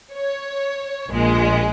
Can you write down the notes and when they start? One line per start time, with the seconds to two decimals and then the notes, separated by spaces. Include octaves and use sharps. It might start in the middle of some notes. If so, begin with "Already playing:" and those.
0.12 C#5
1.10 A#1 A#2 G#3